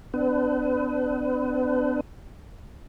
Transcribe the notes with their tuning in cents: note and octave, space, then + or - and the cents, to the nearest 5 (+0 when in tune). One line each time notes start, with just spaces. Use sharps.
B3 +45 D4 +0 B4 +35